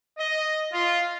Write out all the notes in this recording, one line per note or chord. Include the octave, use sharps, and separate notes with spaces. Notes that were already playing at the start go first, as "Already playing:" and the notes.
D#5
F4